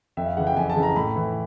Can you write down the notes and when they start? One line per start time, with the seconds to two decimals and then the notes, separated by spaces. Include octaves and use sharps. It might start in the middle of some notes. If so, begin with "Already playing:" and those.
0.17 F2 E5
0.27 F5
0.37 C#3 E3 F#5
0.47 G5
0.57 F2 G#5
0.70 A5
0.76 C#3 E3
0.83 A#5
0.96 A2 B5
1.16 E3